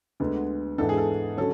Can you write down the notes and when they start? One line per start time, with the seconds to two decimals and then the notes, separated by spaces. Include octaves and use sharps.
0.20 D2 D3 G#3 B3
0.78 G#2 E3 B3 D4 A4
0.89 G#4
0.97 A4
1.37 D3 F#3 C#4 A4